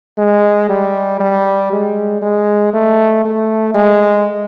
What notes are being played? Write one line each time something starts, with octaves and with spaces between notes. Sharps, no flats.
G#3
G3
G3
G#3
G#3
A3
A3
G#3